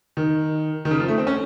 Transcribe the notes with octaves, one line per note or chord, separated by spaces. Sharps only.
D#3
D#3
C#3
F3
A3
C4
C#4